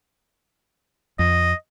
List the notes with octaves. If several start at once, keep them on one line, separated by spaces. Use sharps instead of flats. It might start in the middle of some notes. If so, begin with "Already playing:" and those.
F2 D#5